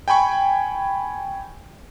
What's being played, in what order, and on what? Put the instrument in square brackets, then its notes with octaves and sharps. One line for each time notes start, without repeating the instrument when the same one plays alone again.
[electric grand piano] G5 G#5 B5 C#6